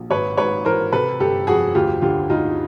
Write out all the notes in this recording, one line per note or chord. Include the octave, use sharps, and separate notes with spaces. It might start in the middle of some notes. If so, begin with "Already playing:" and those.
Already playing: A#1
G#1 B4 C#5
G#2 B4 C#5
E3 A#4 C5
C3 A4 B4
G1 G4 A4
F2 F#4 G#4
D2 F4 G4
D3 F4 G4
D2 D#4 F4